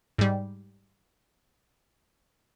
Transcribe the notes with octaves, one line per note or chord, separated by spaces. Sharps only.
G#2 G3